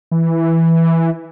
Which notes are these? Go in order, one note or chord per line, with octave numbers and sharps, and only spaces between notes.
E3